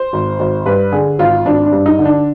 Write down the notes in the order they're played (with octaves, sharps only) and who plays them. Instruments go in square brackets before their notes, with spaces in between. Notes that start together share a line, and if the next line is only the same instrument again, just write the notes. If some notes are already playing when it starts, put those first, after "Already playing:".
Already playing: [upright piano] C5
G#1
G#1
G2 B4
D3 G#4
G#1 F4
G#1 D4
D4
G2
D#4
D3
D4